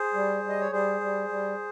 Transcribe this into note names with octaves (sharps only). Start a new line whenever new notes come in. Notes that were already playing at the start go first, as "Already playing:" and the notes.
Already playing: G#4 C5
G3
G3
D#5
C#5
G3 G#4 C5
G3
G3